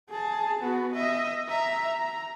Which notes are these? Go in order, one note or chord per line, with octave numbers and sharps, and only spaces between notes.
G#4 A5
B3 F#4
D#5 E5
E5 A#5
A#5